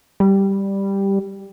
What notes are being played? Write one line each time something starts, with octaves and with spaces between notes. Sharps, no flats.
G3